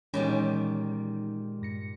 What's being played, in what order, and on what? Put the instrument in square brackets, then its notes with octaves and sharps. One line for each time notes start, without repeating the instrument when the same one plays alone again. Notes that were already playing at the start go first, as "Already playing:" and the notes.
[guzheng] A#2 D#3 G3 [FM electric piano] E3 D#4 [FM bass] G#3 [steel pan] C#4
[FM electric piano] G2 A#6 C#7